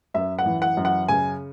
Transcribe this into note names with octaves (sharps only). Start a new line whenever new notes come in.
F#2 E5
F#5
E3
F#5
F#2
F#5
C#3 G#5